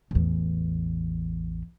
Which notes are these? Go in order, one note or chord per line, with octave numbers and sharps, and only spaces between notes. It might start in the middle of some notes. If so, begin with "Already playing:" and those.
A1 E2